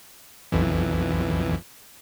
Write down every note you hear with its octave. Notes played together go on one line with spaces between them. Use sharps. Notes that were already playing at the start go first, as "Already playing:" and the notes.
B1 F2 E3